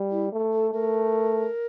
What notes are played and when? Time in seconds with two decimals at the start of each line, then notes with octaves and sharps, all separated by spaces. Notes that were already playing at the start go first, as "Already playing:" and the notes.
Already playing: G3
0.11 E4
0.32 A3
0.53 A4
0.73 A3 A#4